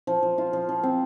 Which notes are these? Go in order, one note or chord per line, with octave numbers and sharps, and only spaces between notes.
F3
F3
F4
F3
F3
C4